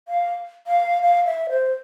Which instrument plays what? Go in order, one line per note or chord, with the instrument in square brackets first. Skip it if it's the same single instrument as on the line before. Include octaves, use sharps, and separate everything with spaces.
[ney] F5
F5
F5
E5
C5